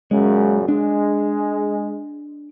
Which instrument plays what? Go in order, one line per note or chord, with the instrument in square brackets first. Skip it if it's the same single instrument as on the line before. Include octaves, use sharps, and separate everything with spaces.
[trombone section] F#2 A#2 C#3 [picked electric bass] G#3
[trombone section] G#3 [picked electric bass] D4